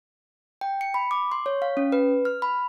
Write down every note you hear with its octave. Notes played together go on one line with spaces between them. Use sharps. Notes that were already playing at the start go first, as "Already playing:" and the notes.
G5
C#7
B5
D6
C6
C#5
F5
C#4
B4
F6
B5